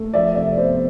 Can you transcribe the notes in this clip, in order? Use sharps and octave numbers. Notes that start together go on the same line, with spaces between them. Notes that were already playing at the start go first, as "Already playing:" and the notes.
Already playing: A3
F3 D5 E5
C3 D5 E5
B3 C5 D5